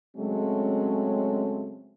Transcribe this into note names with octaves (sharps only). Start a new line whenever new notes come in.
C#3 F#3 G#3 A3 C4 C#4